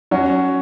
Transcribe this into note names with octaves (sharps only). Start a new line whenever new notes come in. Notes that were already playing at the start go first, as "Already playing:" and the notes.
F#3 C#4 F#4